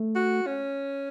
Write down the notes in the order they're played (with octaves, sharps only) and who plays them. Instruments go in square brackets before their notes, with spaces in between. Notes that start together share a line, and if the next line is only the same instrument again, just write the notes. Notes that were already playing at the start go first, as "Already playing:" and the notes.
Already playing: [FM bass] A3
[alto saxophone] F#4
C#4